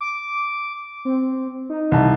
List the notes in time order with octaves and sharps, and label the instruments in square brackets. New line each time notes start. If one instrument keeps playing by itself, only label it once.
[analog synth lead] D6
C4
D#4
[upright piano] C2 A5